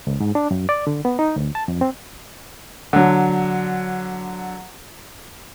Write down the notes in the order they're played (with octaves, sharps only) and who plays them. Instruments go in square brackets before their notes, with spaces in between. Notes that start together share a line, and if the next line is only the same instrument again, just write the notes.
[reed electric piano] C#2
G#2
D4
F#2
D5
D3
B3
D#4
D2
A5
F2
C4
[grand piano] D3 F#3